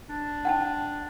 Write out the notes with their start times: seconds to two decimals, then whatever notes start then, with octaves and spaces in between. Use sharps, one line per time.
0.10 D4
0.45 F#5 G5 A5